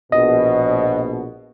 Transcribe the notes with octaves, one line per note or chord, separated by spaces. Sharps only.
A#1 B2 D#5